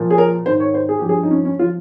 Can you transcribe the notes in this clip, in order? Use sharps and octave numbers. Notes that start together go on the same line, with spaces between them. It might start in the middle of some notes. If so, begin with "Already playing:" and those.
Already playing: A#2 F3
G#4
A#4
G#2 D#3 C5
C#5
C5
G#4
G2 F3 G4
G#4
D#4
C#4
C#4
F3 F4